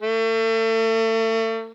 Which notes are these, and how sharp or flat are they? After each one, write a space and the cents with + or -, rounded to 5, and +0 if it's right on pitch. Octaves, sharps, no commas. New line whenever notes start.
A3 +35